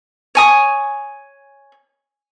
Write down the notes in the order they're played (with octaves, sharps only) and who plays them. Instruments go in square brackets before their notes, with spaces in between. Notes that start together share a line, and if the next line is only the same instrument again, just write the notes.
[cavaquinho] C#5 G#5 D#6